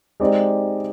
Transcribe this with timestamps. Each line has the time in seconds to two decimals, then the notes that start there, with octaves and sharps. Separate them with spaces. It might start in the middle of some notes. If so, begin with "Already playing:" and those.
0.20 G#3 C4 D#4 G4 D5